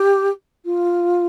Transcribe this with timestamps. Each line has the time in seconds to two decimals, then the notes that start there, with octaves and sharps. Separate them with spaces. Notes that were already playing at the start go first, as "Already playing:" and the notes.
Already playing: G4
0.65 F4